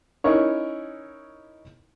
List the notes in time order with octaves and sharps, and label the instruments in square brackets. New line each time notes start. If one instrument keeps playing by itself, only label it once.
[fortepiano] C#4 D#4 E4 A#4 C#5